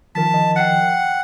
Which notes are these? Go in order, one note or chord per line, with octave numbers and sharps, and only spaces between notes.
D#3 F3 A#4 A5 B6
D#5
F#5 G5 C7 C#7